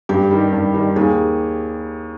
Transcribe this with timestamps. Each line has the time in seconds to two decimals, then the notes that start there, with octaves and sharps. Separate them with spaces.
0.09 G2 G4
0.31 D#3 G3
0.53 G2
0.74 D#3 G3
0.96 D#2 G#4